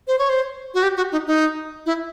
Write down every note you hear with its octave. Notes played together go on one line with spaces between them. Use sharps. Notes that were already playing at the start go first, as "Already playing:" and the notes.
C5
C#5
C5
F#4
G4
F#4
D#4
D#4
E4